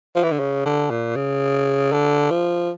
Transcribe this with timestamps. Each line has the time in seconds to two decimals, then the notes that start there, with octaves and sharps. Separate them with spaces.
0.16 F3
0.23 E3
0.32 D3
0.39 C#3
0.66 D3
0.90 A#2
1.16 C#3
1.92 D3
2.30 F3